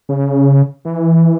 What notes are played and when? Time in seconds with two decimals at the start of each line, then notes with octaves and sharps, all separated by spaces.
0.09 C#3
0.85 E3